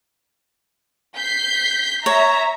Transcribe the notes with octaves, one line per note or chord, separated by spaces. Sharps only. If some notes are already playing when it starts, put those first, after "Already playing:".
G6 B6 C7
C#5 E5 A#5